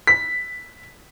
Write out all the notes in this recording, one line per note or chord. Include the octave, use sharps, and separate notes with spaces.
B6